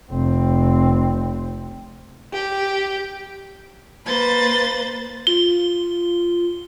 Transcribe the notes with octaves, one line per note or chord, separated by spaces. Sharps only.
F1 C4
G4
A#3 B4 C5 A6
F4 G7